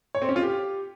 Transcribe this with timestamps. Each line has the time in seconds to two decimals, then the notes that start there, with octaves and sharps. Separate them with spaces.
0.15 C#5
0.22 C4
0.29 C#4
0.36 F4
0.43 G4